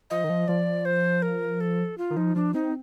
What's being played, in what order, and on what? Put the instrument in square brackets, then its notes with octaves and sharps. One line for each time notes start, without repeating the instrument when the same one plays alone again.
[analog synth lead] F3 [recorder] D#5
[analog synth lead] D#3
F3
[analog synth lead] F3 [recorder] D5
[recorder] C5
A#4
A4
F4
[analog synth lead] D#3
[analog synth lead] F3 [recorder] D#4
[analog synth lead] F3 [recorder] D4
[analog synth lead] C4 [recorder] D#4